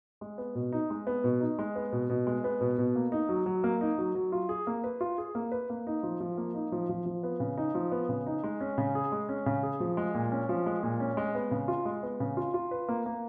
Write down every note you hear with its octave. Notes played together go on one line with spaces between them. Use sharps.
G#3
B3
B2
D#4
G#3
B3
B2
D#4
G#3
B3
B2
B2
G#3
B3
B2
B2
A#3
D#4
F#3
F#3
A#3
D#4
F#3
F#3
F4
G#4
A#3
B4
F4
G#4
A#3
B4
A#3
D#4
F3
F3
A#3
D#4
F3
F3
F3
B3
C#3
D#4
F3
B3
C#3
D#4
G#3
C#4
C#3
G#4
G#3
C#4
C#3
G#4
F3
G#3
A#2
C#4
F3
G#3
A#2
C#4
G#3
B3
C#3
F4
G#3
B3
C#3
F4
F4
B4
A#3
A#3